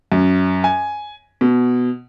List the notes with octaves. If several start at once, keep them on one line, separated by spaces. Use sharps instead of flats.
F#2
G#5
B2